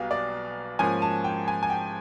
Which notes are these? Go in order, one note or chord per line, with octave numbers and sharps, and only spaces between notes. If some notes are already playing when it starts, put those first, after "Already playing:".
Already playing: B1 B2 G3 B3 F5
D5
G#2 F3 A#3 C#4 G#5
A5
G5
G#5
G#5
G5